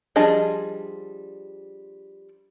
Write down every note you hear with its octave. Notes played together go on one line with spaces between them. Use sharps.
F3 G3 D4 G#4 D#5